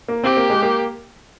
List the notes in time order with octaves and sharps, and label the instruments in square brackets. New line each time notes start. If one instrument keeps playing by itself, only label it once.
[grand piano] A#3
[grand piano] C4 [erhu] G4
[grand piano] A#3
G#3
A#3